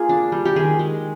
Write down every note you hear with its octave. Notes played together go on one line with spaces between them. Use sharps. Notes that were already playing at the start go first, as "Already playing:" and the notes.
Already playing: A#3 F4 G#4
D4
G3
G4
D#3 G#4
G#3